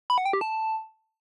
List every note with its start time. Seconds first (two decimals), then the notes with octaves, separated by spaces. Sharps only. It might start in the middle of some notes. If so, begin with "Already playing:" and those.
0.10 B5
0.18 F#5
0.26 G5
0.33 G4
0.41 A5